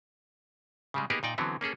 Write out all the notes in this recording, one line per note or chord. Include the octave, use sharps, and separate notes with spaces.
C#3 G3 G#3
A#3 B3 D#4 G4 G#4 A#4
A#2 D#4 D5 G5
D3 E3 F#3 B3 C4
A#3 C#4 G#4 A4